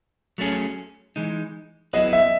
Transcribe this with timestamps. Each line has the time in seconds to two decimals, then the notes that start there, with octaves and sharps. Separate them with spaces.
0.38 F#3 A3 C#4 G#4
1.16 E3 G#3 D#4
1.93 F#3 B3 E4 G#4 B4 D#5
2.13 E5